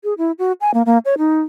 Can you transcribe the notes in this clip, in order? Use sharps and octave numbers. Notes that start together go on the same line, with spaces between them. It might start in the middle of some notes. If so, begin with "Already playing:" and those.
G#4
E4
F#4
G#5
A#3
A#3
C#5
D#4